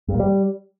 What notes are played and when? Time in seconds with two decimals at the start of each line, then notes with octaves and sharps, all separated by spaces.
0.08 G2
0.14 A#2
0.19 G3